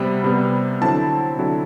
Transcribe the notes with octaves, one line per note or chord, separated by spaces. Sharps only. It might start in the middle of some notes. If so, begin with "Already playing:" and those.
Already playing: C3 G3 B3 B5
C3 G3 B3
D3 F#3 C4 E4 A5
D3 F#3 C4 E4